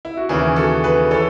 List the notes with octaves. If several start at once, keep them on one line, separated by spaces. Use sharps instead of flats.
E4
F#4
D#2 C#3 E3 E4 G#4
F#4 A4
G#4 B4
E3 A4 C#5